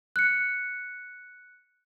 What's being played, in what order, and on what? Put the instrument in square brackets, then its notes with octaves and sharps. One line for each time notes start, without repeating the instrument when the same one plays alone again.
[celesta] F#6 C#7